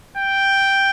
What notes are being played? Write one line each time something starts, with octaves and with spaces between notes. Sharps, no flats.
G5